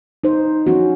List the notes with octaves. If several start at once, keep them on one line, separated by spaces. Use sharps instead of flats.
D#4 C5
F3 C#4 F#4